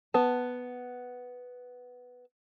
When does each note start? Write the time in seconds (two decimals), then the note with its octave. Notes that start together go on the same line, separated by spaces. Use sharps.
0.14 B3 A5